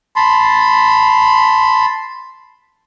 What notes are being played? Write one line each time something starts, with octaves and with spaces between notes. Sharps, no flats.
A5 B5 C6